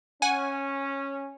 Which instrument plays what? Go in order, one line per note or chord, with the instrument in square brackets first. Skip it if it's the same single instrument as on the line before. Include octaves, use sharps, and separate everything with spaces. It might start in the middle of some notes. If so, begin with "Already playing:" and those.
[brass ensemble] C#4 [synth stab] F#5 G#5